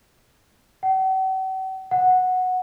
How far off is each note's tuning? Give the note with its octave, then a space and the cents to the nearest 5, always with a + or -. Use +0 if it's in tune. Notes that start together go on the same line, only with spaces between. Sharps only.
F#5 +45
F#5 -10